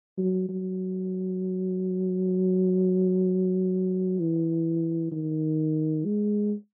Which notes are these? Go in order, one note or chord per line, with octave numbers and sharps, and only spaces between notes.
F#3
F#3
E3
D#3
G#3